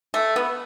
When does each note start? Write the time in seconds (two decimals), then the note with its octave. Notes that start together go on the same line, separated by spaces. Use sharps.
0.14 A3
0.36 B3